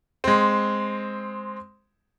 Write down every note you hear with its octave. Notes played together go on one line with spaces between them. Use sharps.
G#3 C4